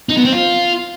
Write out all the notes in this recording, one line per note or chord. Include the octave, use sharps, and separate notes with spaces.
D#4
B3
C4
F4